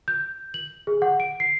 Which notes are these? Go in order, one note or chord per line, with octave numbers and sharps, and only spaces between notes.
G6
F#7
G#4
F#5
D7
C7